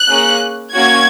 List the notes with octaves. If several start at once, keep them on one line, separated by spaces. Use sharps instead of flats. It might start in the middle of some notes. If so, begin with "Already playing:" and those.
Already playing: F#6
A#3 C#4 G#4
A#3 C#4 F#4 G#6